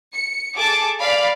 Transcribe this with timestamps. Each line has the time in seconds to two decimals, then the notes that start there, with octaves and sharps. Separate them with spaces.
0.15 C#7
0.56 G#4 A4 A5 D6
1.01 D5 F5 B5